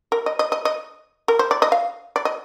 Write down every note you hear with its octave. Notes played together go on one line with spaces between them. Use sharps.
A#4
D#5
D#5
D#5
D#5
A#4
C5
D5
D#5
F5
D5
D#5